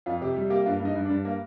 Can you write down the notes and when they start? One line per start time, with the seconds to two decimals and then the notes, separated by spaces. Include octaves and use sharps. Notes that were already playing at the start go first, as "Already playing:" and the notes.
0.06 F2 F4
0.21 C3 G4
0.36 G3
0.50 A#3 G4
0.66 G2 F4
0.80 G2
0.85 D#4
0.95 G2
1.05 D4
1.10 G2
1.25 A#3